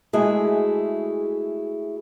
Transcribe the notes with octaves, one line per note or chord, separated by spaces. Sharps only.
G#3 A3 E4 F#4 G#4 E5